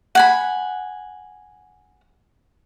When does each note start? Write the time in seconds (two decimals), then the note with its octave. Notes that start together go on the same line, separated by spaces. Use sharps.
0.15 F#5 G#5 B5